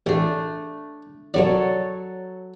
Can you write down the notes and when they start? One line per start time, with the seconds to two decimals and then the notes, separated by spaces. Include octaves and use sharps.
0.06 A1 A3 D4
1.34 F#2 F#3 A4 C#5 D5